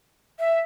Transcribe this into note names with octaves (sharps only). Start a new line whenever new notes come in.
E5